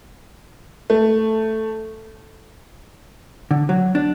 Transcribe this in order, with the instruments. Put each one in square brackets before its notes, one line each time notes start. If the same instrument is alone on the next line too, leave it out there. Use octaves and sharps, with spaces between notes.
[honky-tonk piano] A3
[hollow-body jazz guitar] D3
F#3
D4